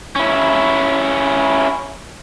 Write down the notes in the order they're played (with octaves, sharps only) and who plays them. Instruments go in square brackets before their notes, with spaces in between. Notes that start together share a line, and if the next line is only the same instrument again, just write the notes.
[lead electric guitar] C#4 E4